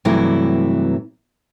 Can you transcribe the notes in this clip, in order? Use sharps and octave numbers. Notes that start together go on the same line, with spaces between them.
G2 C3 E3 F#3 A3 E4